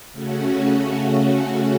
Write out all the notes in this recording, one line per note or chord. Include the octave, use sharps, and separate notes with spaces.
C#3 A3 C#4 F#4